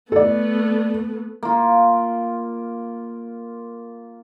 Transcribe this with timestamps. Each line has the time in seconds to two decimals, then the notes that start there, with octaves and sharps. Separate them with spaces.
0.12 A3 B3 A4 D5
1.43 A#3 F4